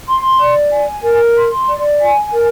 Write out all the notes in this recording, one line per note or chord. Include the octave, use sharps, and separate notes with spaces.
C6
D5
G#5
A#4
C6
D5
G#5
A#4